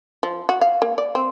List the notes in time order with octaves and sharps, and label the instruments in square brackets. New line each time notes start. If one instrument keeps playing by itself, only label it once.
[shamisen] F3
F#4
F5
A#3
D5
C4